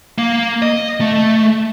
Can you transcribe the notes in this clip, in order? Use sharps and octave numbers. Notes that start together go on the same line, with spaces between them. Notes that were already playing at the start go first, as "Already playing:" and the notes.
A#3
D#5
A3